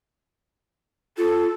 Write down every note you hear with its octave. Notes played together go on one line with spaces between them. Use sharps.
F4 A4